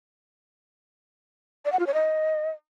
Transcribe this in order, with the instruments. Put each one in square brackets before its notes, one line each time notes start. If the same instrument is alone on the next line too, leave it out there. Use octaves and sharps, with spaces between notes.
[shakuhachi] D5
F#5
F4
C#5
D#5